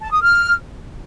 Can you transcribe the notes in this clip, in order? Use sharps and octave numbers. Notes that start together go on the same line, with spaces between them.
A5
D#6
F6